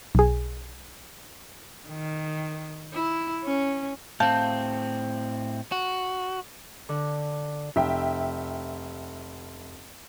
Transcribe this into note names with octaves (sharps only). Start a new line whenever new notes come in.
B1 G#4
D#3
E4
C#4
A2 C4 F5 A5 G6
F#4
D3
F1 E5 G5